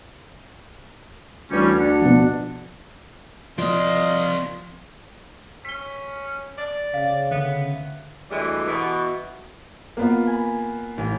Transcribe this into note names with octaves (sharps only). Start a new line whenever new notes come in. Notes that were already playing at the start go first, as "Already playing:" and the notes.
D2 E3 G3 C#4
D4 F#5
B2 F3
F3 C4 F4 D5 D#5
C#4 B6 G7
D5
C#3 F5
D3 B3 E5
D2 E3 G3 G#3
B2 E3
A#3 B3 F4
G#5 B5
A1